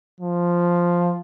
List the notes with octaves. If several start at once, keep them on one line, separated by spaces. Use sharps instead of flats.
F3